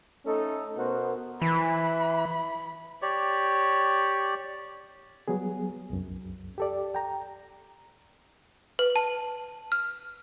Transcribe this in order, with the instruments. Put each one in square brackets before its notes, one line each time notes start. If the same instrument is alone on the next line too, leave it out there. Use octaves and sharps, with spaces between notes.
[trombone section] A3 C#4 D#4 A4
B2 B3 F#4 A#4 C5
[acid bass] E3 [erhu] B5
[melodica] G4 C#5 D5
[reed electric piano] F#3 G3 B3 G#4
C2 F#2
G4 A4 D5
G5 A#5
[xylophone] B4
A5
F6